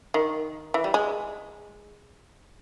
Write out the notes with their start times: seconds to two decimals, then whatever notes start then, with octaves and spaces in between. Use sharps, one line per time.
0.14 D#3
0.74 E3
0.84 G3
0.94 G#3